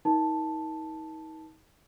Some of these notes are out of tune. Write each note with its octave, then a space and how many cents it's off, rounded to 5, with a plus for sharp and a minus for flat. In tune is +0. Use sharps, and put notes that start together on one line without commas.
D#4 +35 A#4 +45 A5 +0